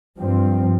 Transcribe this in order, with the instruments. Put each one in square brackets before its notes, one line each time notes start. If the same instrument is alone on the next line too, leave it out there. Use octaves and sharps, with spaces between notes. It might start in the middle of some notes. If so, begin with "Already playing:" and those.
[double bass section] G2 F3 C4